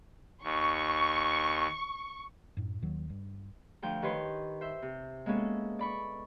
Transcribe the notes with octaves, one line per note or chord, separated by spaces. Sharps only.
D#2 C#6
F#2 A2
D#2 D#3 F#3
G2
D2 F3 G5
D#3 G4 B4 C#5 C6
C5 E5
C3
G#3 A#3 B3 C#4 A4
D5 B5 C#6